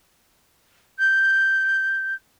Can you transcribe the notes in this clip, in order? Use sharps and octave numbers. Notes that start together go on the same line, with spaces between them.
G6